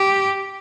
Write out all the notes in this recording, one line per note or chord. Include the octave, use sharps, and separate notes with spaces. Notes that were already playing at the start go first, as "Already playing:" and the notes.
Already playing: G4